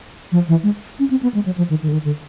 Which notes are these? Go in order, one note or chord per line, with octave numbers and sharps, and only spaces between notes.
F3
E3
G#3
C#4
C4
B3
G#3
F#3
F3
D#3
D#3
D3
D#3
D3